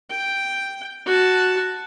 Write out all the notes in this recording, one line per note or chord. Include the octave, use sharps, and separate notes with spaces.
G5
F#4 A5